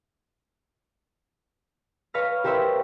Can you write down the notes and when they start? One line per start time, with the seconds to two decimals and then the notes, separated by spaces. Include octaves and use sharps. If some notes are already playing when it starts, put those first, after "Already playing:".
2.14 B4 C#5 F5 B5 F6 A#6
2.44 G4 A#4 C5 C#5 E5